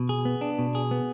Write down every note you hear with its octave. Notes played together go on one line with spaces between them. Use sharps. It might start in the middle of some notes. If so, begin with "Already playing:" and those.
Already playing: B2
G#4
B3
D4
B2
G#4
B3